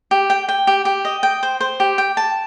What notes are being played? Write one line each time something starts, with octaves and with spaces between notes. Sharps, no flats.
G4
G5
G5
G4
G4
D#5
G5
C5
C5
G4
G5
A5